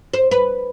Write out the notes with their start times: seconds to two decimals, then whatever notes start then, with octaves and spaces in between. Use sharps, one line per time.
0.14 C5
0.31 B4